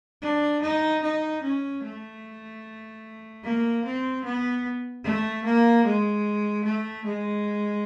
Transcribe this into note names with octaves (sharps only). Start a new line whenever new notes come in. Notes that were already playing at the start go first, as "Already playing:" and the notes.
D4
D#4
D#4
C#4
A3
A#3
C4
B3
A3
A#3
G#3
A3
G#3